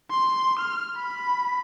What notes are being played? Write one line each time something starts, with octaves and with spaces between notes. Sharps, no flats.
C6
F6
B5